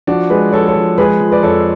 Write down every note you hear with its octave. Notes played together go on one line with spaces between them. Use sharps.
F3 D4 F#4
G#3 G#4 B4
F3 A4 C#5
A4 C#5
F3
G#3 G#4 B4
F3
B4 D5
F2 A4 C#5